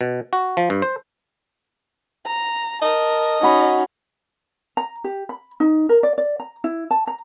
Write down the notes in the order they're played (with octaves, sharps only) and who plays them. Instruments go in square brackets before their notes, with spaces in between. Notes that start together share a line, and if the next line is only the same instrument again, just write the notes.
[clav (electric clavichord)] B2
F#4
F3
G2
C5
[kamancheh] A#5
[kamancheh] A#4 A5 [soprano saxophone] D#5
[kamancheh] C#4 D#4 [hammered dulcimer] F#4 B5
[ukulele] A#5
G4
B5
D#4
A#4
D5
D5
A#5
E4
A5
A#5